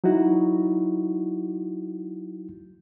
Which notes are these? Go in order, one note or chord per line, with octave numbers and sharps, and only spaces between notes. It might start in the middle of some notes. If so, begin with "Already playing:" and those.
F#3 D#4 E4 F#4